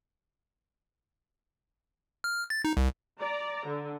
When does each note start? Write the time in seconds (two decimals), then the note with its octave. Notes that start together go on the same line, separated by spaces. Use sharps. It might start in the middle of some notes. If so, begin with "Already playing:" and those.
2.24 F6
2.50 A6
2.65 D#4
2.77 C2
3.20 D5 A#5
3.67 D3